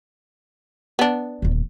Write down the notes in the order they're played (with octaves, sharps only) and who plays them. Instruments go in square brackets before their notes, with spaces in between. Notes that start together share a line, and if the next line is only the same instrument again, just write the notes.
[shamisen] B3 D4
[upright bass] D#1 D2